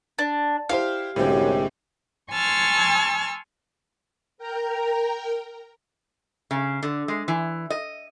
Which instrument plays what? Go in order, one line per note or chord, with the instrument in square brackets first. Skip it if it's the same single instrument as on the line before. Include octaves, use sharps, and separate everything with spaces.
[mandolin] D4
[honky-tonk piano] E4 G4 C5 [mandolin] F5
[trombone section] C2 G#3 G4 [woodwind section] F#2 [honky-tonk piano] A2 D3 C4
[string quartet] G#5 A5 C6 C#6 E6 F6
[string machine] A#4 G5 A#5
[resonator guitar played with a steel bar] C#3
D3
G#3
E3
D#5